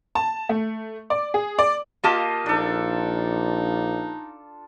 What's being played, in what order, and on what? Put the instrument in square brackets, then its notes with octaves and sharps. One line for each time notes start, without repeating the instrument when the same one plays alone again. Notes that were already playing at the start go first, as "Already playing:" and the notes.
[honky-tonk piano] A5
A3
D5
G#4
D5
[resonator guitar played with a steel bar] A#3 G4 A5 [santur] F4 D#5 F5
[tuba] A#1 [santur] D4 A4 [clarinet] D#4